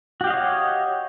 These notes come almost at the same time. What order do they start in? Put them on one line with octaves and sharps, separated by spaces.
F#4 G4 F5 D#5 C#5